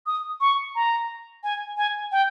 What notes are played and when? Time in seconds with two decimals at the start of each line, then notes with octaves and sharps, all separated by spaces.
0.06 D#6
0.41 C#6
0.75 A#5
1.43 G#5
1.77 G#5
2.12 G5